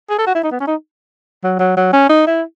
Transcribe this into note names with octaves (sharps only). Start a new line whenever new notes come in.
G#4
A4
F#4
E4
D#4
B3
C#4
D#4
F#3
F#3
F#3
C#4
D#4
E4